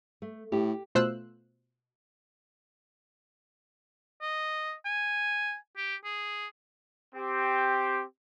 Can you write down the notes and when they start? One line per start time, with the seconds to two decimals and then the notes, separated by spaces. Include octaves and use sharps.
0.22 A3
0.52 A2 G4
0.95 B2 A3 F4 C5 E6 F#6
4.21 D#5
4.85 G#5
5.77 G4
6.04 G#4
7.15 C4 G4